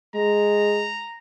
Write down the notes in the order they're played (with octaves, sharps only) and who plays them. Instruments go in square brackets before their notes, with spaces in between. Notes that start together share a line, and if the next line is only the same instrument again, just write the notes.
[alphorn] G#3 [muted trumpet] A#5